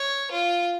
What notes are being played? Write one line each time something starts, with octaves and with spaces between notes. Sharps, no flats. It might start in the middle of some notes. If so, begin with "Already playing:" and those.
Already playing: C#5
F4